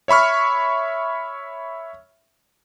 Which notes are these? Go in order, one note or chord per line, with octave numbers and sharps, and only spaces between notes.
C#5 E5 B5 C#6 F6